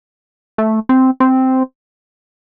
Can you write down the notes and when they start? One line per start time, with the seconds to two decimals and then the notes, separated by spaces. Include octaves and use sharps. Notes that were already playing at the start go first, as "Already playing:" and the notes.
0.58 A3
0.89 C4
1.20 C4